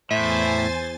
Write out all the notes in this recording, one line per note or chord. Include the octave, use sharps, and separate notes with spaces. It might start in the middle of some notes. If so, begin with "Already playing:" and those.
E2 A2 C5 E5 G#5 A6